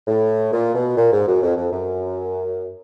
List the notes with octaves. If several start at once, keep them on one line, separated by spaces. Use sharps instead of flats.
A2
A#2
B2
A#2
G#2
F#2
F2
F2
F#2